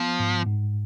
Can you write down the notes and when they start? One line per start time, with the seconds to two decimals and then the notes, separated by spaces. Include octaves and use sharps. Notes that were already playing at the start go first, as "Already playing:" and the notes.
Already playing: F3 B3
0.20 G#2
0.47 G#2